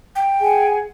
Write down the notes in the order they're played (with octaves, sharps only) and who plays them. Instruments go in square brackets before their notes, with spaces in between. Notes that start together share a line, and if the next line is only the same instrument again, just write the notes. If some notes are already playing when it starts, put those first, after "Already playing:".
[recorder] G5
[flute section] G#4 F#5 G#5